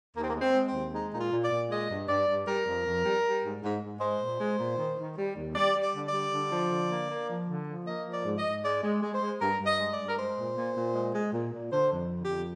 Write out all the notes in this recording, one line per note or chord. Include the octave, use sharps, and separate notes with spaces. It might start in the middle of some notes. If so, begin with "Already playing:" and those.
D#2 A#3
C4
A#3
G#3
C4
G#3
C4
D#2
G#3 D#4
A#2 D#4
F4
A#2
D5
A#2
G#3 D#5
G2
G2 D5
G2
G3 A#4
F2
F2
G3
G3
G#2
G#2
G#2
G#3 C5
A#2
G#3
A#2
D#3
D#3
G3
D#2
G3 D5
G3
D5
D3
D5
G3
D3
F3
D3
A#3
A#3
F3
D3
F3
A#3 D#5
F3
D5
G#2
D#5
G#2
G#3 D5
G#3
G#3
C5
G#3
G2 A#4
G2
D#5
G#3
D5
G2
A#4
G#3 C5
A#2
A#2
A#2
G#3
G#3
A#2
A#2
D3 C5
F2
D3
G4
F2